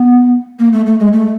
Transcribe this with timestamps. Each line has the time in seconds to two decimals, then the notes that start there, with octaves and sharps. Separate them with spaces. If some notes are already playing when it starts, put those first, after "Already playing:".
Already playing: B3
0.59 A#3
0.72 A3
0.86 A3
0.99 G#3
1.12 A3